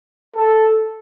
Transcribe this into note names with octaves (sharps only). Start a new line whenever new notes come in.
A4